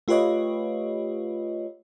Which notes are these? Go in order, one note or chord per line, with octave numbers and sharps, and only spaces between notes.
A3 F4 G4 B4 C#5 D#5